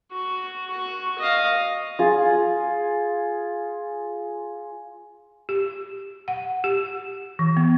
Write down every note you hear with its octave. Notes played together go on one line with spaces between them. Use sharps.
F#4
F#4 C#6
D#5 F5
F4 G#4
G4
F#5
G4
E3
B3